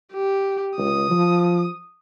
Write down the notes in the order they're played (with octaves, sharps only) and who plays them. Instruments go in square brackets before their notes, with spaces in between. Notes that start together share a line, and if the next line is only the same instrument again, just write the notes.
[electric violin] G4
[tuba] C#2 [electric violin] D#6
[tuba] F3